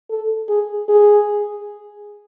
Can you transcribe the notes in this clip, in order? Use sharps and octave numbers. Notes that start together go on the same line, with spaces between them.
A4
G#4
G#4